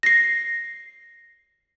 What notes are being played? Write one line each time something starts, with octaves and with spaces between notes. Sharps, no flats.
A#6 C7